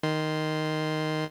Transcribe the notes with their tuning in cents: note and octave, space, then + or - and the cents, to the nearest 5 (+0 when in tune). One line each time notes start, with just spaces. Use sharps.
D#3 +0 C6 +0